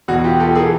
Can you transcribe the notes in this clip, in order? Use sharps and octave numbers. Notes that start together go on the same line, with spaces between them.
E2 B2 F#4
F4 G4
G4 A4
E3 G#4 A#4